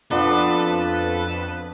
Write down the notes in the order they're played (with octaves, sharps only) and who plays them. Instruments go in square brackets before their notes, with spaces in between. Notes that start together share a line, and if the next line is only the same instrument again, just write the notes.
[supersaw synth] F2 B4 [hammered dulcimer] B3 D4 [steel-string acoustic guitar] F4 [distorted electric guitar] A4